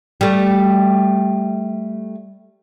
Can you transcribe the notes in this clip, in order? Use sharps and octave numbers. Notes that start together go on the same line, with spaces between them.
G3 A3